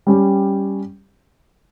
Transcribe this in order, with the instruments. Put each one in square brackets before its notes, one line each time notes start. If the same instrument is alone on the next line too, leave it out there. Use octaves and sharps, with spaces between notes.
[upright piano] G3 C#4 G4